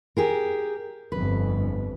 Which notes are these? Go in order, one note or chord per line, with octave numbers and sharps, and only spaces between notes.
G4 G#4 A#4
G1 F2 B4